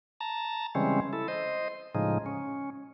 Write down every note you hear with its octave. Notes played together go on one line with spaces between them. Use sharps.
A5 A#5
C#3 E3 G3 G#3 C4 C#4
E4 A4
C5 D#5
A2 C#3 F3 G#3 D#4
C#4